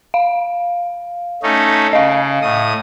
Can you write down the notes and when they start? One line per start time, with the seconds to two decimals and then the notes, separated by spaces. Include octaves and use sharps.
0.14 F5
1.43 A3 C#4 D#4
1.93 C#3 D#5 F5
2.42 A2 D#6